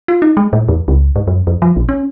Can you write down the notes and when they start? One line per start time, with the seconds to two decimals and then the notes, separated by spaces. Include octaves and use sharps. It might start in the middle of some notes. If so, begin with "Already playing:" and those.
0.08 F4
0.22 D#4
0.37 G#3
0.53 A2
0.68 E2
0.88 C#2
1.16 G#2
1.27 F#2
1.47 F2
1.62 F3
1.76 A#1
1.89 C#4